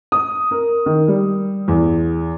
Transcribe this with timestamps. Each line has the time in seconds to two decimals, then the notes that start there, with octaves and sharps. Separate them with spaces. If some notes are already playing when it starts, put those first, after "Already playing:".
0.12 D#6
0.51 A#4
0.86 D#3
1.08 G3
1.68 E2